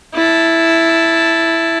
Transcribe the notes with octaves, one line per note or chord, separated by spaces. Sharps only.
E4 A5